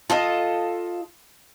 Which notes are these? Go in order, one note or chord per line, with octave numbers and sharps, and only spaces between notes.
F4 A4 D#5